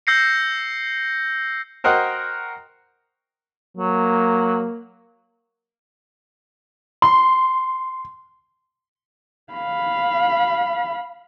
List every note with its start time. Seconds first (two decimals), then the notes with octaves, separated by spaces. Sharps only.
0.07 E6 G6 A#6 C7 C#7
1.84 F#4 A#4 C5 D#5 F#5 G5
3.77 F#3 A#3
7.02 C6
9.53 F5 B5